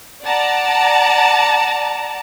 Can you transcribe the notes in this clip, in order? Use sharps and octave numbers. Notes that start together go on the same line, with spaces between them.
D5 F#5 A5 A#5